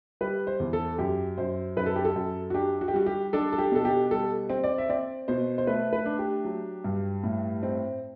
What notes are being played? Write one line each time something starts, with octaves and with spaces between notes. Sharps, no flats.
G3 B4
C5
E2
A4
F#2 G4
F#2 C5
F#2 B4
A4
G4
A4
F#2
F#4
D4 G4
F#4
G4
G3 F#4
G4
D4 A4
A4
G4
B2 A4
G4
G3 A4
C4
D5
E5
C4 D5
B2 C5
C5
A3 B4
B4
D4
G4
F#3
G2
A2
C4